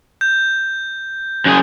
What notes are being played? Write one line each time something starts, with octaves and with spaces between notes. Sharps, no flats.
G6
F#2 G#4